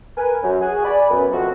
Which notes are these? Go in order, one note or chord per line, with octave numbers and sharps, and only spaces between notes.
A#4 B4 G#5
F#2
F#4 G#4 G#5
D5 G#5 B5
F#2 B3
F#2 B2 F3 A3 C4 F#4